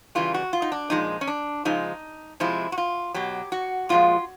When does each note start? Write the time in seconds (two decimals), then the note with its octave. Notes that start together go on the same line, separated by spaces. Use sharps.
0.15 C#3 E3 G3 F4
0.34 F#4
0.53 F4
0.62 D#4
0.72 D4
0.90 A#2 F3 G#3 D#4
1.21 C#4
1.27 D4
1.65 C#3 F3 G#3 D#4
2.40 C3 F3 G#3 E4
2.72 F#4
2.78 F4
3.14 B2 F#3 G4
3.52 F#4
3.89 A#2 F3 G#3 F4